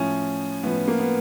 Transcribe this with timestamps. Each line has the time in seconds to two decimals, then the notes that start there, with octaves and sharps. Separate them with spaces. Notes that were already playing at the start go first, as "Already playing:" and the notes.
Already playing: A2 F3 C#4
0.63 A2 B3
0.66 F3
0.88 A#3
1.00 B3